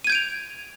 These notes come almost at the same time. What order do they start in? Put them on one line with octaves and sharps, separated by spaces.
D#7 G#6 G6 D7 F7